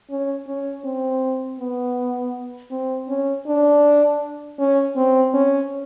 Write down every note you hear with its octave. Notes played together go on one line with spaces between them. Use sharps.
C#4
C#4
C4
B3
C4
C#4
D4
C#4
C4
C#4